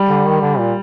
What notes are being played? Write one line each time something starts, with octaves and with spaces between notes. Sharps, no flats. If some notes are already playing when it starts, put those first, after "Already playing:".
Already playing: G3
D3
D#3
D3
A#2